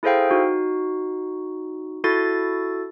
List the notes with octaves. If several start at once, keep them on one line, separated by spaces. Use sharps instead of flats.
E4 G#4 A4 C5 F5 G5
D#4 F#4
E4 F#4 A4 A6